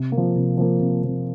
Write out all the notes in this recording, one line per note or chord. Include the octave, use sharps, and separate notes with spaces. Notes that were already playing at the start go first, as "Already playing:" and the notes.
Already playing: C3
A#3
F3
C3
F3 A#3
C3
F3 A#3